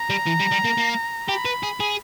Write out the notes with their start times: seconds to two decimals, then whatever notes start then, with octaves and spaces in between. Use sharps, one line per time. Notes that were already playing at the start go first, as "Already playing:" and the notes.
Already playing: A#5
0.10 G3
0.26 E3
0.40 G3
0.51 G3
0.64 A#3
0.78 A#3
1.29 G4 B5
1.45 B4
1.63 G#4
1.80 G#4